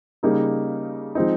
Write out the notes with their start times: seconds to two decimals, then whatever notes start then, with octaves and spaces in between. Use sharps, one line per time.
0.23 C#3 G3 A#3 D#4
1.15 F3 G#3 C4 D#4